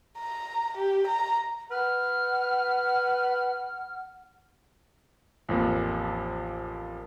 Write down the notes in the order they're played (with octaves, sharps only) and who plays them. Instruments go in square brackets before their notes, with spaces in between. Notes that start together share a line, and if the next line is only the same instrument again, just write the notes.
[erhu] A#5
G4
A#5
[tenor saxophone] B4 [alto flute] F#5 [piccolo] F6
[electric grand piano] A1 F2 F3 A#3